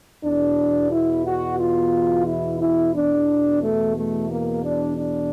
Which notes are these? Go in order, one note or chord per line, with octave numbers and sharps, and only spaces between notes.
E2 B2 D4
E4
F#4
F4
E4
E4
E2 B2 D4
A3
A3
A#3
D4
D4